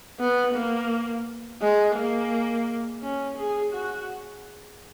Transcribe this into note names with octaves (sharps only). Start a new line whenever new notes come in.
B3
A#3
G#3
A#3
C#4
G#4
F#4